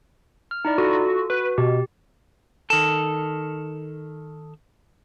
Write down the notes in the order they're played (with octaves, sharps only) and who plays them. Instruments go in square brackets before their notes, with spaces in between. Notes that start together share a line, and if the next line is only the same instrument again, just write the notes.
[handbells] F6
D#4 E4 D5
[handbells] F4 A4 [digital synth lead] F#4
[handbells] F#4 [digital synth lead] B4
[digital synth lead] B2 [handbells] G4
[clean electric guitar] D#3 A4